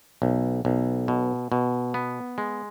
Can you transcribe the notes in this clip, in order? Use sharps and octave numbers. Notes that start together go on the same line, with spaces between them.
B1
B1
B2
B2
B3
G#3